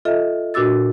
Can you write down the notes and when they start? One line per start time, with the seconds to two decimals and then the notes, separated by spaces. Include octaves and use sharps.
0.05 F4 A4 D#5 E5
0.54 A#2 D4 F#4 D6 E6 A6